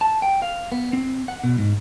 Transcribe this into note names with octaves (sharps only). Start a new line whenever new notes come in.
A5
G5
F5
B3
C4
F#5
B2
G#2